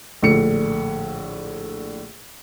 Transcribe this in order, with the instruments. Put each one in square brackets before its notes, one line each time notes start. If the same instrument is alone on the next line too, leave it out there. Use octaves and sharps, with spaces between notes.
[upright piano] A#1 A2 D3 C#7